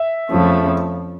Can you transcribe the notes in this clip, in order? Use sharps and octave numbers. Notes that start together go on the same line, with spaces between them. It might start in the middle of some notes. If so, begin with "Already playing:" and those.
Already playing: E5
F2 C#3 F3 A3